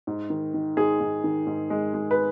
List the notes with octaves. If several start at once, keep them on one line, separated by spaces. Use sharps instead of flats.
G#2
D#3
D#3
G#2 G#4
G#2
D#3
G#2
G#3
G#3
B4